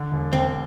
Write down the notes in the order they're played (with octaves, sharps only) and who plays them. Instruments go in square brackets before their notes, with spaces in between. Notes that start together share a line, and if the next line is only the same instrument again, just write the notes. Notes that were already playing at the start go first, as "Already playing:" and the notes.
Already playing: [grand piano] D3
E1
[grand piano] E1 [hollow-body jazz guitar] C4